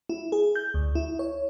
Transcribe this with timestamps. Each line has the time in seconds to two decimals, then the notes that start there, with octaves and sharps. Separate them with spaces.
0.09 E4
0.32 G#4
0.55 G6
0.74 D2
0.95 E4
1.19 C#5